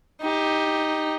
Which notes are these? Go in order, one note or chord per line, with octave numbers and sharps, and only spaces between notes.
D#4 G4